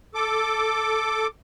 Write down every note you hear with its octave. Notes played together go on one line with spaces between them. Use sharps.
A4 D6